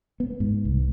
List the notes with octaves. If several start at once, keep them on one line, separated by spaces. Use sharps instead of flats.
B3
G#2
C2